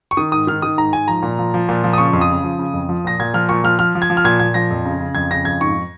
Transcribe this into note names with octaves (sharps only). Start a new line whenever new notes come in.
C#6
D#3 D#6
G#2 D#6
D#3 F6
D#3 D#6
G#2 A#5
G#2 G#5
F3 A#5
A#2
F3
F3
A#2
F3
D#6
C#3 C#6
F2
D#6
C#3
F3
C#3
F2
F3
A#2 A#6
A#2 G#6
F3 F6
A#2 C#6
F3 F6
F3 F6
F3
G#6
F3
F6
A#2 G#6
A#2 G#6
F3 A#6
F2
C#3
C#3
F2 G#6
C#3 A#6
F2 G#6
G#2 C#6